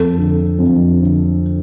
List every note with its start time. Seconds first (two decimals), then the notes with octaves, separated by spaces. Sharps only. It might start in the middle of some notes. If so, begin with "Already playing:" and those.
Already playing: F2 A4
0.18 D3
0.59 F2
1.01 D3